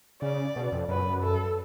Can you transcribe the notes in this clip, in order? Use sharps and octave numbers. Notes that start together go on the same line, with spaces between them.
C#3 D5
B2
F2
F#2 B4
A4